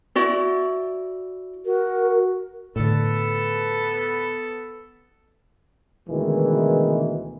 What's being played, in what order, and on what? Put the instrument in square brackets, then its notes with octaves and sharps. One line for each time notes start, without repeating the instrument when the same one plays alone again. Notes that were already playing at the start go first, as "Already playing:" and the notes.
[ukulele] E4 F#4 D5
[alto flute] F#4 [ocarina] A#4
[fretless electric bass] A2 D3 [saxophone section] B3 A4
[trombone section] D2 B2 D#3 E3 G#3